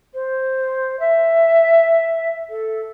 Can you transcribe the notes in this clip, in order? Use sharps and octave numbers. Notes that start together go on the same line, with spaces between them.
C5
E5
A4